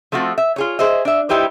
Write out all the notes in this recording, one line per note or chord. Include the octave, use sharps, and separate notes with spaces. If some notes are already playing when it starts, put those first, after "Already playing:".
F3 A3 C4 F4 F#4
E5
F4 G#4 C#5
G#4 C5 D#5 E5
D4 E5
G3 D#4 E4 G4 B4 C5